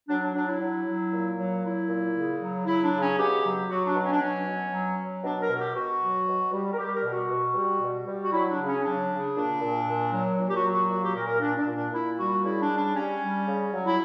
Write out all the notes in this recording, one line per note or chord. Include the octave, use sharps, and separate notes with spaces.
F#3 D4
D4
F#3 D4
E4
F#3
F#3
A#2
F#3
F#3 E4
A#2
C#3
F#3
F#3 E4
D4
C#3
C#4
B2 G4
F#3
F#3 F#4
D4
B2
C#4
D4
F#3 C#4
B2
F#3
F#3
B2 D4
A#4
B2
G4
B2 F#4
F#3
B2
G3
A#4
G3 G4
A#4
B2
F#4
B2
G3
B2
G3
F#4
F#3 E4
D4
C#3
C#4
F#3 D4
C#3
A#2 D4
A#2
A#2
F#3
A#2
G4
F#4
F#3
F#4
A#2 F#4
G4
A#2 A#4
A#4
A#2 D4
D4
A#2
D4
A#2 E4
G3 F#4
C#3 E4
D4
G3
D4
G3 C#4
G3
C#3
F#3
E4